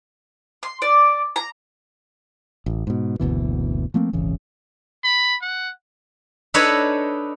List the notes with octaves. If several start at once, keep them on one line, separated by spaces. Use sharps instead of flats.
C6
D5
A#5
A1
G#2 B2
F#1 D2 B2 E3
F3 A3 A#3 C4
D#1 G#1 C#3 E3
B5
F#5
D4 D#4 A4 B4 C#5 D#5